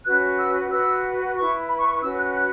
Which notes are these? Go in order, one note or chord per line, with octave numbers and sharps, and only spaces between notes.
C#4 F#4 B4 F#6
E6
F#4 B4 E6
E4 B4 C#6
B5
C#6
C#6
C#4 F#4 B4 E6
F#6
F#6